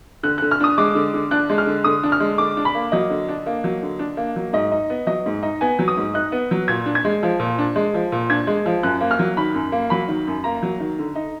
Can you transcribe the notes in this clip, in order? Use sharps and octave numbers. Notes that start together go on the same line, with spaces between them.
D3 F#6
D3 F#6
F6
D4 D#6
G#3 D6
D3
D3
D4 F#6
G#3
F6
D3
D3 D#6
D4
F6
G#3
D3 D6
D4
B5
A#3
F#3 D#5
D3
D4
A#3
F#3
D3
D4
A#3
F#3
G#2 D#5
D#4
B3
F#3 D#5
G#2
D#4
B3 G#5
F#3
D#6
G#2
D#4 F#6
B3
F#3
A#2 G#6
D4
G#6
G#3
F3
A#2
D4
G#3
F3
A#2
D4 G#6
G#3
F3
F#2 F#6
A#3
F6
F#3
D#3 B5
F#2
A#3
F#3 B5
D#3
F#2
A#3 A#5
F#3
D#3
D3
D#4